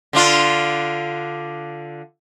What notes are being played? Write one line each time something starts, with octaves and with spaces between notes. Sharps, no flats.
D3 D4 F4